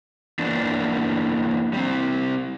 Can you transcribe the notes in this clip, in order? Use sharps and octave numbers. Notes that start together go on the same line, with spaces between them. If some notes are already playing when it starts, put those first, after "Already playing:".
E3 A#3 B3 D4
G3 C4